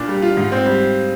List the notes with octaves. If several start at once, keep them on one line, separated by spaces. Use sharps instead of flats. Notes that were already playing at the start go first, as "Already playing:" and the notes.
Already playing: A#2 D4 F4
G3
F4
G#2
C4
G3